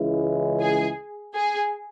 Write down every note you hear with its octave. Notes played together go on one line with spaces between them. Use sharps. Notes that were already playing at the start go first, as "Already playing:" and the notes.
Already playing: C#2 C#3 E3 G#3 E4
G#4
G#4